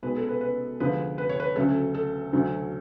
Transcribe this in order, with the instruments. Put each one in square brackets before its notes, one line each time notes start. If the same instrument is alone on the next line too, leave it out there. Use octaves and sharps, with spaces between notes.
[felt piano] B1 B2 G#3 B4
A4
B4
B4
D2 D3 F3 G#3 B4
B4
C#5
B4
D2 C#3 F#3 A3 A4
A4
D2 D3 F#3 A3